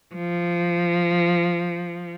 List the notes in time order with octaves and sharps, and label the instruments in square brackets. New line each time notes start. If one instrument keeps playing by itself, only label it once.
[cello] F3